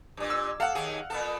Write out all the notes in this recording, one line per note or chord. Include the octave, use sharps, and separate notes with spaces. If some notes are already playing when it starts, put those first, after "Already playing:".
G2 A#2
E6
A4 F5 F#5
D#2 D#3 G#4
A#2 B3 A4